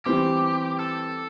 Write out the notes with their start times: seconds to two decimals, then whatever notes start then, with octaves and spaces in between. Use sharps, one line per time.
0.06 E3 G3 C4 G4
0.79 A4